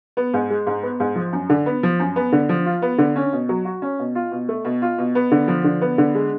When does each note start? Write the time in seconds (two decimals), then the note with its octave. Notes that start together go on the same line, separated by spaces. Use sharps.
0.17 B3
0.34 G#2
0.50 G#3
0.67 G#2
0.83 B3
1.00 G#2
1.16 F3
1.33 F#2
1.49 D3
1.66 B3
1.83 F3
1.99 F#2
2.16 B3
2.32 D3
2.49 F3
2.66 F4
2.82 B3
2.98 D3
3.16 C#4
3.32 B2
3.49 F#3
3.65 F#4
3.82 C#4
3.99 B2
4.15 F4
4.32 B2
4.49 A3
4.65 B2
4.82 F4
4.98 B2
5.15 B3
5.31 D3
5.48 F3
5.64 D3
5.81 B3
5.98 D3
6.15 G#3